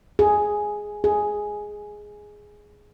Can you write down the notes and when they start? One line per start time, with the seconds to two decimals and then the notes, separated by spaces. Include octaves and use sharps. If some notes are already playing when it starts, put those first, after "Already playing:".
0.19 G#4
1.04 G#4